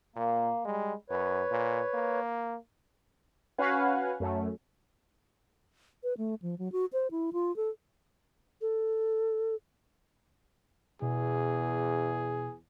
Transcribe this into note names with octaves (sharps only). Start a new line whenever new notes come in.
A#2 A#3
G3 G#3
F#2 B4 C#5
A#2
A#3
C#4 F#4 B4 F5 F#5 G#5
F#2 A3 C#4
B4
A3
F3
F#3
F#4
C5
E4
F4
A4
A4
E2 B2 G#4